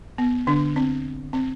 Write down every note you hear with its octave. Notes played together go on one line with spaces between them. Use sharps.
B3
D3 D4
C4
C4